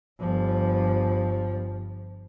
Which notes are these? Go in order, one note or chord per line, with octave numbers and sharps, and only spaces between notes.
G1 F3